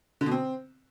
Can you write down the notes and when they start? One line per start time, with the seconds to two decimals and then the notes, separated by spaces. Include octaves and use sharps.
0.21 D3
0.26 B2
0.31 C4